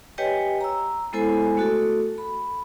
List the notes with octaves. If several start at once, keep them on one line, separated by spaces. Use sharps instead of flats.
G4 B4 C#5 D#5 G5 G#5
A#5 E6
G#3 B3 E4 A4 C5 G#5
A3 F#4 A4
B5